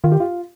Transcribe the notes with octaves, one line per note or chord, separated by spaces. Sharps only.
D#3 F4
G4
F4